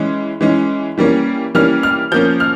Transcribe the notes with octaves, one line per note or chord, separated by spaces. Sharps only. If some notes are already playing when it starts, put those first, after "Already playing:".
Already playing: E3 G#3 C#4
E3 G#3 C#4
E3 G3 A#3 C#4
E3 G3 A#3 C#4 F6
F6
F3 A#3 C#4 G6
F6